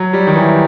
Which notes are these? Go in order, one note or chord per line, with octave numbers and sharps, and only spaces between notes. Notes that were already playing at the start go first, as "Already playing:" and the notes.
Already playing: F#3
G3
D#3
E3